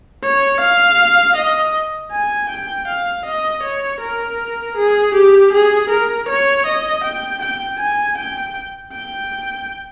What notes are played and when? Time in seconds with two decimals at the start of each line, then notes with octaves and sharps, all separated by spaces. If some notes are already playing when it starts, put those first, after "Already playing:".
0.23 C#5
0.61 F5
1.36 D#5
2.11 G#5
2.49 G5
2.87 F5
3.25 D#5
3.63 C#5
4.00 A#4
4.77 G#4
5.14 G4
5.53 G#4
5.90 A#4
6.28 C#5
6.66 D#5
7.04 G5
7.42 G5
7.79 G#5
8.18 G5
8.93 G5